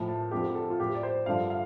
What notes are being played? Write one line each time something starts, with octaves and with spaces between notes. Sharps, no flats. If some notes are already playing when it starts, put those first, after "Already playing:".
Already playing: A2 F3
A5
F2 D3 F3 G4
A4
F4
A2 F3 G4
D5
C5
G2 D3 F3 F5
F5